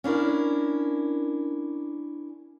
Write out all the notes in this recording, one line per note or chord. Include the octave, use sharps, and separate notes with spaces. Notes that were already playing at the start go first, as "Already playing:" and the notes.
C#4 D4 E4 A#4